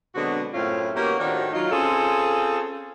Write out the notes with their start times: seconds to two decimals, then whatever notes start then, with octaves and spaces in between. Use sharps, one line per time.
0.15 B2 D3 F#3 G#3 C4 F#4
0.54 F#2 A2 C4 C#4 E4 F4
0.96 D#3 A#3 B3 C#4 F#4 G4
1.19 A2 D#3 F3 D4 F#4
1.53 F#3 D#4 F4
1.72 C4 C#4 F4 G#4 A4